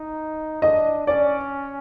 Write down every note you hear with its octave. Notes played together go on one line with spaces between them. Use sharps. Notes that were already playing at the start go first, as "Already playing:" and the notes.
Already playing: D#4
D4 D#5
C#4 D5